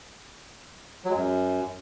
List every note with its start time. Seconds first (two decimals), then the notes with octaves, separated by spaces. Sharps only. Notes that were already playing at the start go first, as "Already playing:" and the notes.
1.05 F#3
1.10 G#3
1.15 F#2